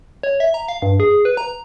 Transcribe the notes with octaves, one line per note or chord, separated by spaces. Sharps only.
C#5
E5
A#5
F5
G2
G#4
B4
A#5